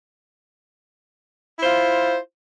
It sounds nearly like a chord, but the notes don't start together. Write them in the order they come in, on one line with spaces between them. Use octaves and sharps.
E4 C5 F4